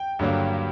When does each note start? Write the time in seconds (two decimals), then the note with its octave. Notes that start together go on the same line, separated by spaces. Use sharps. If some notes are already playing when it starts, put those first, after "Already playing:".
Already playing: G5
0.19 G2 D3 F#3 A#3